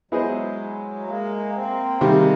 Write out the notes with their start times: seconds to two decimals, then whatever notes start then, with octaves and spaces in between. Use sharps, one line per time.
0.11 F#3 G#3 B3 E4 G#4 C5 D#5
1.07 G#3 A#3
1.54 A#3 C4
2.01 C3 D#3 G3 G#3 A#3